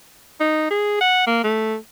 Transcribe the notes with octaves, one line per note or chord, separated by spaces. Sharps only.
D#4
G#4
F#5
A#3
A3